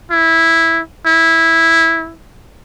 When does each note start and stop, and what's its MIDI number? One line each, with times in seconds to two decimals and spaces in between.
0.11 0.81 64
1.06 2.16 64